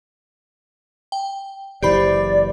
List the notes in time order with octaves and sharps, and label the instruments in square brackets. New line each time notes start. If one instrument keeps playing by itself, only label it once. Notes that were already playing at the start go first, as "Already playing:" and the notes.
[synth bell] G5
[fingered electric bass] F#1 E3 [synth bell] G4 C5 B5 [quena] D5